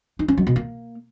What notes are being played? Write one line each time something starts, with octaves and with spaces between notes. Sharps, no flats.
D#4
C#4
F#3
B2
A#3